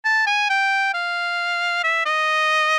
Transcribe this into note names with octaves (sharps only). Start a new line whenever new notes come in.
A5
G#5
G5
F5
E5
D#5